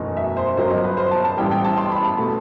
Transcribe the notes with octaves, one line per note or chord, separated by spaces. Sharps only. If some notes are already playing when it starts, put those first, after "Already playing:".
Already playing: F#1 E2 B2 A3 D#4
E5
C5
G1 F#2 F#3 C5
D#5
B4
C5
A5
A5
A1 A2 G3 G5
G5
A5
C6
B5
A5
B2 A3